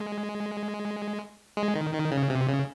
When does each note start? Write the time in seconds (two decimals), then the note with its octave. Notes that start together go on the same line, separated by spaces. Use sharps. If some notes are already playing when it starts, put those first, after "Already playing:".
Already playing: G#3
1.57 G#3
1.75 D#3
1.94 D#3
2.12 C#3
2.30 C3
2.48 C#3